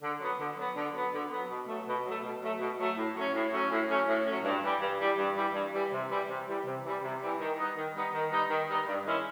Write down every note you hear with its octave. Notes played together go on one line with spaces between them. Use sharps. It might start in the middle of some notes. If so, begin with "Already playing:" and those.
D3
F#3 B3
D3
F#3 B3
D3
F#3 B3
D3
F#3 B3
B2
F#3 A3
B2
F#3 A3
B2
F#3 A3
B2
F#3 A3
A2
F#3 A3 C#4
A2
F#3 A3 C#4
A2
F#3 A3 C#4
A2
F#3 A3 C#4
G2
E3 G3
G2
E3 G3
G2
E3 G3
G2
E3 G3
C3
E3 G3
C3
E3 G3
C3
E3 G3
C3
E3 G3
D#3
G3 B3 D#4
D#3
G3 B3 D#4
D#3
G3 B3 D#4
D#3
G3 B3 D#4
G2
D#3 G#3 C#4 E4